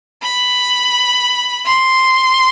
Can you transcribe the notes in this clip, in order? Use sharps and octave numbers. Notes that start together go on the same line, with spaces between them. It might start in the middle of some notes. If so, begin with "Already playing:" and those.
B5
C6